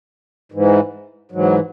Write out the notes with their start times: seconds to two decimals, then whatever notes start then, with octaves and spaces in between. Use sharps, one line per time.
0.52 G#2 E3
1.32 G#2 E3 F#3